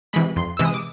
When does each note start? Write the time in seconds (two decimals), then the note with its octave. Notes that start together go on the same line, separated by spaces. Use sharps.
0.13 C3 E3 G#3 B5
0.36 F2 C6
0.57 C3 E3 G#3 E6
0.65 D#6
0.74 D6